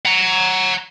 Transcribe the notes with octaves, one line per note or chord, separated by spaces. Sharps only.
F#5 A#5